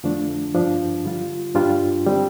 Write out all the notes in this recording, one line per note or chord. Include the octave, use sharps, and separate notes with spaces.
F2 D3 F3 A3 D4
G2 F3 D4
D3 G3 F4
G2 G3 D4 F4
D3 G3 C4